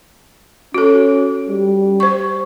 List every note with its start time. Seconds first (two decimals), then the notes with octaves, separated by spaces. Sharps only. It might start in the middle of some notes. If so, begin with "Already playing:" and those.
0.74 C#4 F#4 A4
1.48 G3
2.00 C5 C#6